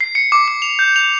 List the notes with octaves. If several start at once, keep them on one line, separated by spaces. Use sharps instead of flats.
C7
C#7
D6
D6
F7
G6
F7